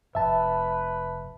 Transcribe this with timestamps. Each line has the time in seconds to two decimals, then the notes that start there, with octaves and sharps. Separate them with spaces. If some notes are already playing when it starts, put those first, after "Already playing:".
0.15 F1 B4 E5 A5